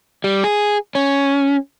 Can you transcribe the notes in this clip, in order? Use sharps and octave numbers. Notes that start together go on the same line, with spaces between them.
G3
G#4
C#4